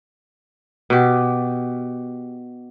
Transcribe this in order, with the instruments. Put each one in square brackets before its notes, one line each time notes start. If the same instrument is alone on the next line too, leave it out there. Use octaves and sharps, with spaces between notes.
[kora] B2 G4